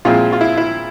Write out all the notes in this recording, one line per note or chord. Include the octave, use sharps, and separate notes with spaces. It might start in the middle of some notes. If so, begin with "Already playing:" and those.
A#2 F3 G#3 C4 E4 F4
F4
E4
E4